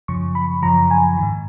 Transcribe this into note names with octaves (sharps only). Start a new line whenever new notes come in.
F#2 C#3 F3 C#6
B5
F#2 C#3 F3 A#5
G#5
G#2 D#3